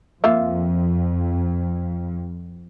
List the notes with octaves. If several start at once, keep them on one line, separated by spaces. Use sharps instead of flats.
F2 A#3 F4 E5